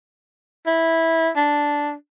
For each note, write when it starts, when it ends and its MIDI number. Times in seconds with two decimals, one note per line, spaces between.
0.67 1.30 64
1.36 1.93 62